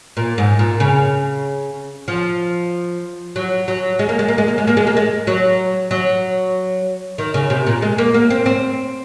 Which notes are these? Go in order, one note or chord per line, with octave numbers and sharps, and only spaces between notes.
A#2
G#2
A#2
C#3
F3
F#3
F#3
G#3
A#3
G#3
A#3
G#3
A#3
G#3
A#3
G#3
A#3
G#3
F#3
F#3
D#3
C#3
C3
A#2
G#3
A#3
A#3
C4
C4